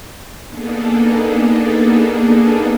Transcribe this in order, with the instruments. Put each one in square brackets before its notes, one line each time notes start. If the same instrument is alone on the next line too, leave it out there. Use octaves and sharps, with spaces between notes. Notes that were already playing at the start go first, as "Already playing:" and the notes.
[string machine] A#3 B3 D4 D#4 G#4 A4